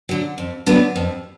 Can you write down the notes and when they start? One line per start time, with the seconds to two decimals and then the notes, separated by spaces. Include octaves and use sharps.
0.09 D3 F#3
0.38 F2
0.66 D3 F#3 B3 D4
0.96 F2